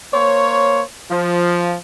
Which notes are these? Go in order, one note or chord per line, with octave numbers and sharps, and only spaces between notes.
A#3 C5 C#5
F3